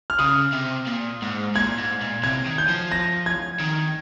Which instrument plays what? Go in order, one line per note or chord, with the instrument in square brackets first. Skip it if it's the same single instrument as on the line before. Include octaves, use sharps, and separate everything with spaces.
[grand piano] F6
[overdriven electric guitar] C#3 [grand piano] D#6
[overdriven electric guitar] C3
A#2
G#2
[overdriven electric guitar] A#2 [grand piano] G#6
[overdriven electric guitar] G#2
A#2
[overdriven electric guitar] C3 [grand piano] G#6
[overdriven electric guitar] D#3
[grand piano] G6
[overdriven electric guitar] F3
[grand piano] A#6
G#6
[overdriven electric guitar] D#3